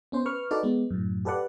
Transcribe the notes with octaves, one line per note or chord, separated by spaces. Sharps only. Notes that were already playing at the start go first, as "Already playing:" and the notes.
B3 C#4 C5
B4 C#6 F6
D#4 F#4 A4 B4 D5
G#3 B3
F#2 A2
G4 A4 B4 D5 F#5